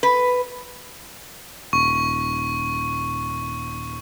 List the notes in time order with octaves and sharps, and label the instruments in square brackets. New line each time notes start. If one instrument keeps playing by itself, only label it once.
[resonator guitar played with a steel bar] B4
[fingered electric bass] D#1 [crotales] C#6